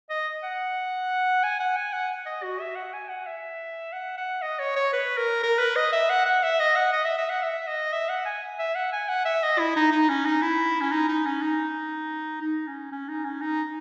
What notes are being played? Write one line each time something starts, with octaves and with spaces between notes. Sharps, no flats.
D#5
F#5
G#5
F#5
G#5
F#5
D#5
F#4
E5
F#5
G#5
F#5
E5
F#5
F#5
D#5
C#5
C#5
B4
A#4
A#4
B4
D#5
E5
F#5
F#5
E5
D#5
F#5
D#5
E5
E5
F#5
E5
D#5
E5
F#5
G#5
E5
F#5
G#5
F#5
E5
D#5
E4
D#4
D#4
C#4
D#4
E4
C#4
D#4
D#4
C#4
D#4
D#4
C#4
C#4
D#4
C#4
D#4